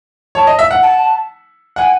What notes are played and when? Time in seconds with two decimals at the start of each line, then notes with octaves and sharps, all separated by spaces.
0.35 C#5 A5
0.47 D#5
0.59 E5
0.71 F#5
0.82 A5
1.76 F#5 G#5